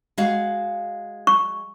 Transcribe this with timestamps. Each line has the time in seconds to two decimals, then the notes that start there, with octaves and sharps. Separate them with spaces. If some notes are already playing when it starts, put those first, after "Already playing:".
0.18 G#3 F#4 F5
1.27 C#6